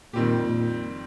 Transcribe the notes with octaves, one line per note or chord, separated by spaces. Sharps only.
F2 A#2 D#3 G3 C4 G4
A#2